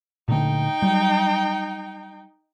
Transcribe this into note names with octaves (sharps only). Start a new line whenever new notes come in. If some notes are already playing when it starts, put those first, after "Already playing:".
A#2 D3 A3 D#4 G5
F#3 G3